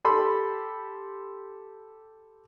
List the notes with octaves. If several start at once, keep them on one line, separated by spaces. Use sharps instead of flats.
G4 A4 B5 C6